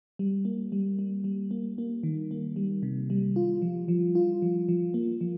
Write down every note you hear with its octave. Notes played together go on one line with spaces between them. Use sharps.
G3
A#3
G3
G3
G3
A#3
A#3
D#3
A#3
G3
C3
G3
F4
F3
F3
F4
F3
F3
A#3
F3